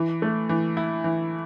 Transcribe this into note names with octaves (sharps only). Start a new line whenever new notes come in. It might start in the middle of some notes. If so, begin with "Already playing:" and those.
Already playing: E3
A3
E3
E4
E3